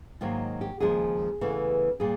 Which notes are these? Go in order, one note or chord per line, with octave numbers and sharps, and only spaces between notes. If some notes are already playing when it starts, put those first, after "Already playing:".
G#2 D#3 F#3 A#3 F4
G4
D#2 C#3 F3 G#3 G#4
E2 C#3 E3 A3
A#2 G3 G#4